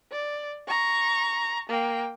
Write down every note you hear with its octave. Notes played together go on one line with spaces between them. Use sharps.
D5
A#5 C#6
A#3 G5